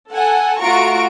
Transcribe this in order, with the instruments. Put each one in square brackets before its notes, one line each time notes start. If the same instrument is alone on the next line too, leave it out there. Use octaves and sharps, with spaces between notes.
[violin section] A4 F#5 G#5
A3 F4 F#4 A#5 C#6 D7